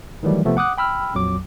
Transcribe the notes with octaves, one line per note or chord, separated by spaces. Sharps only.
D#3 E3 F#3 G3 A3
C3 F3 A3 B3
F#5 D6 D#6 F#6
G5 B5 E6 F6
A#1 F2 F#3 D6